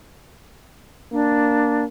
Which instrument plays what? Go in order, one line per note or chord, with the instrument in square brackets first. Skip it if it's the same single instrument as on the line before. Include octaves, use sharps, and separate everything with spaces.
[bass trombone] A#3 [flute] D4